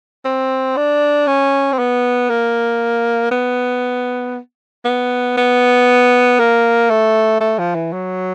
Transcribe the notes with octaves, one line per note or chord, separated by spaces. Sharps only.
C4
D4
C#4
C4
B3
A#3
B3
B3
B3
A#3
A3
A3
F3
E3
F#3